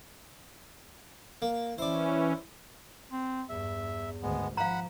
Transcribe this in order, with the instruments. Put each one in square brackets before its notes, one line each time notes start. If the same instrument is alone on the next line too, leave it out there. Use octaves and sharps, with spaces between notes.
[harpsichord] A#3
[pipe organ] E3 C#4 [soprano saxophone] E4 [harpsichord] C5 D5
[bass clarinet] C4
[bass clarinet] E2 [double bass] G2 [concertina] E5
[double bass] G#1 D2 [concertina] G#3 B3
[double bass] F3 [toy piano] F5 A#5 [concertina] F#5 B5